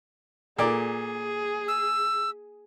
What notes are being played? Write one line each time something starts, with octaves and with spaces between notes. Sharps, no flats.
A#2 A#3 G#4 A4 D5
E6